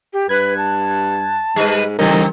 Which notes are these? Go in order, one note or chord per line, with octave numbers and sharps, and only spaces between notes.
G4
G2 B4 F#6 G#6
A5
G#2 G3 B4
C#3 E3 G3 C4 D#4 A#4